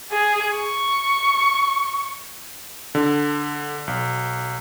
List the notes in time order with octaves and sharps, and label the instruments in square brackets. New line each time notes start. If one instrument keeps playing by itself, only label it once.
[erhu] G#4
C#6
[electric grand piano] D3
B1